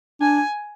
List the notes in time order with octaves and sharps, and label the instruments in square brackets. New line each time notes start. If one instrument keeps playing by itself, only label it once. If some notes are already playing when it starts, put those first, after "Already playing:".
[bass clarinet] D4 [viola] G#5